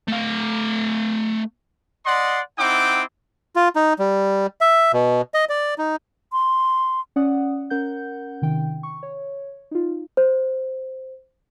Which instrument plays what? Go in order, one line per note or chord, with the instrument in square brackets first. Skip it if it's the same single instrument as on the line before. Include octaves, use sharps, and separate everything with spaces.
[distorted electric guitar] A3 F5
[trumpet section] D5 D#5 F#5 C6
C4 D#4 E4 F#5 G5 D6
[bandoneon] F4
D#4
G3
E5
B2
D#5
D5
D#4
[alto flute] C6
[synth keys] C#4 D5 F#5 D#6
C#4 A#4 F#5 G6
C3 D#3 G5
C#6
C#5
D#4 F4
[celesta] C5